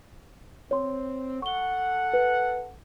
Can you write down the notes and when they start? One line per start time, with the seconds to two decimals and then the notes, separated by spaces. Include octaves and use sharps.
0.71 C4 C#5 C6
1.42 A4 F#5 C#6 G7
2.13 B4